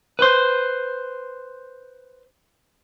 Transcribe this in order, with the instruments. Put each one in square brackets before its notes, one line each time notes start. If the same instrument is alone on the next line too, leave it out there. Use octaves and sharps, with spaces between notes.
[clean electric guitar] B4 C5